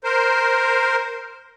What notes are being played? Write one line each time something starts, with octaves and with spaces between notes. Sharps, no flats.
A#4 C5